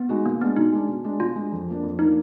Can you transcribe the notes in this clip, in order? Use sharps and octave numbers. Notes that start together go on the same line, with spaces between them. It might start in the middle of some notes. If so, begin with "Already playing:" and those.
Already playing: B3
G#3 D#4 F#4
B2 A#3
G#3 B3 D4
B2 D#4
G#3 D4
B2
G#3 D4
B2 F4
G#3 D4
F2
F3 A#3 D4
F2
F3 A#3 D4 D#4